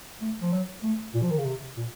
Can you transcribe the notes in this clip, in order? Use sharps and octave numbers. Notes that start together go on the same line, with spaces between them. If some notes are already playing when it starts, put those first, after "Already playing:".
A3
F3
F#3
A3
A#2
F3
D#3
C#3
C3
A#2